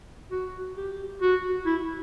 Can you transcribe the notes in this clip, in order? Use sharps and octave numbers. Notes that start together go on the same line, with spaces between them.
F#4
G4
F#4
E4